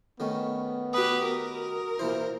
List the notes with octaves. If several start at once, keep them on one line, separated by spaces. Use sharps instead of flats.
D#3 A3 B3 C#4
F#4 G4 B4 D#6
A#4
A#2 E3 E4 C5